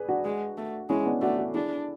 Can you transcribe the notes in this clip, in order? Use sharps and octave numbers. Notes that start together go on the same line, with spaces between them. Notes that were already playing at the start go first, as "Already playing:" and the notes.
Already playing: G#4 B4 D5
D4 F#4
G#3
A3
G#3 C#4 E4
B3 D4
A3 D4 F#4
F#4 A4
D4 E4 G#4